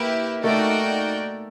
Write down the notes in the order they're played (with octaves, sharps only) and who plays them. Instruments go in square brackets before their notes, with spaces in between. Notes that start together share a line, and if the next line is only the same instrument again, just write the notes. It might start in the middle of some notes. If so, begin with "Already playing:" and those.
Already playing: [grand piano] A#3 [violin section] E4 G4 B4 E5
[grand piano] A3 [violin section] D#4 F#4 A#4 D5 G5